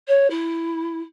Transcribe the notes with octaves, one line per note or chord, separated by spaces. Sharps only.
C#5
E4